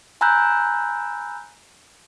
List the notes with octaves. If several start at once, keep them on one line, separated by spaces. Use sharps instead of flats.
G#5 A#5 B5 E6 F#6 G6